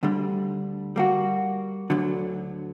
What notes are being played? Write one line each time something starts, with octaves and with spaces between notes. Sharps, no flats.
D2 D3 G3
G3 A#3 F#4
D2 D3 F#3